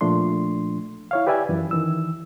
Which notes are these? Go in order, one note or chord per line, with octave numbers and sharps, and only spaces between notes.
A#2 F3 A3 D4 C6
E4 C#5 F5
G4 B4 D5 E5 G#5
F#2 E3
D#3 E3 E6